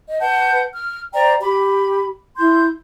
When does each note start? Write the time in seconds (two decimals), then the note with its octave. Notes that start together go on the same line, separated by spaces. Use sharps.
0.06 D#5
0.20 B4 F#5 A5 G6
0.72 F6
1.14 C5 D5 G5 A#5
1.40 G4 B5
2.37 E4 C6 G6